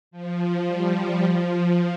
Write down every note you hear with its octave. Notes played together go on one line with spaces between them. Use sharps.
F3
G3
F3